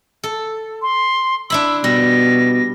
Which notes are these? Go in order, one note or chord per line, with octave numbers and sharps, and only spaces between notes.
A4
C6
D4 E4 B5 E6
B2 G3 A#6